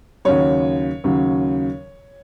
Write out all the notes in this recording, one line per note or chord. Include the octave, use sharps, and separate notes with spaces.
D#2 C#3 F#3 C#5
D#2 C#3 F#3